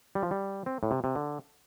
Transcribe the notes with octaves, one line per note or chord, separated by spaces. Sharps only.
G3
F3
G3
C4
A2
C3
C3
D3